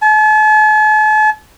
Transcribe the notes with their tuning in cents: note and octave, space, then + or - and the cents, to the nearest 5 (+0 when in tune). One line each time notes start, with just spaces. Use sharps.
A5 -45